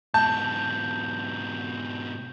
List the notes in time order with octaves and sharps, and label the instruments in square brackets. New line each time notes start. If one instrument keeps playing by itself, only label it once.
[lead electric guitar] G#2 B2 [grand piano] A5 [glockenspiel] G6